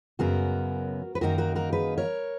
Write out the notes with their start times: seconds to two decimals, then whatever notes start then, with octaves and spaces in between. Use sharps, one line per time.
0.19 F#2 C#3 F#3 B3 F#4 A#4
1.15 B4
1.21 F#2 D#3 A#3 D#4 F#4 A#4
1.38 F#4 A#4
1.56 F#4 A#4
1.73 G#4 B4
1.98 A#4 C#5